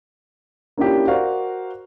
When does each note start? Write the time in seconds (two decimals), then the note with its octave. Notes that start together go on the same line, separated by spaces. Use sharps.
0.77 A#3 C#4 D4 E4 F4 G4
1.08 F#4 A#4 C5 D5 F5